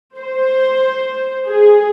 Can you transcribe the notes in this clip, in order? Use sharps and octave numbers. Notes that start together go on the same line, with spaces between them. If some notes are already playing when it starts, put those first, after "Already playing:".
C5
G#4